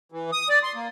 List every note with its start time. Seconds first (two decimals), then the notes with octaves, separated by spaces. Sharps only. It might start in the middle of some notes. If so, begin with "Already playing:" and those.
0.12 E3
0.32 D#6
0.49 D5
0.63 C6
0.75 A#3